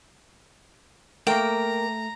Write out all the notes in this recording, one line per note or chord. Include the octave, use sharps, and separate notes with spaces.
A3 A#3 A#4 G5 A#5